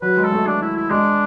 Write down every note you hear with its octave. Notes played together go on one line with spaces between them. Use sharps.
F#3 B4
G#3
A4
A3
D4
E4
E4
G#3 D4